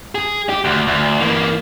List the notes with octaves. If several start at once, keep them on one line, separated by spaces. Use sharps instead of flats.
G#4
G4
D2
D2
E3 A#3